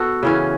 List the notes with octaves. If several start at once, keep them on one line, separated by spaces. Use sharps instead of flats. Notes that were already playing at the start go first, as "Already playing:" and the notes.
Already playing: B3 F#4 A4
C#3 E3 C#4